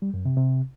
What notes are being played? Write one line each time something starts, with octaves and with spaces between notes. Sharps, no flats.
G3
F#2
C3
C3